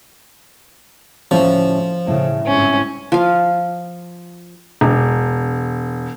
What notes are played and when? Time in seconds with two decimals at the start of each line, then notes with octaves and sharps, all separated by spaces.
1.31 D2 A2 F3 C#4
2.07 A2 C#3
2.46 G1 G#2 C4 C#4
3.12 F3 F5
4.81 E1